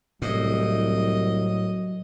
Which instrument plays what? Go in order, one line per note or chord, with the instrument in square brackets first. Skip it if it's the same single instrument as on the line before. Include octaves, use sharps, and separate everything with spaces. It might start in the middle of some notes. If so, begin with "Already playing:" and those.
[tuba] C2 [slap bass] A2 [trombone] F#3 [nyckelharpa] D#5